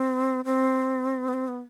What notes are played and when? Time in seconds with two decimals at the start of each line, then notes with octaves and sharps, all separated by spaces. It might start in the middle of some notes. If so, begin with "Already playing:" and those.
Already playing: C4
0.45 C4
1.28 B3
1.34 C4
1.48 B3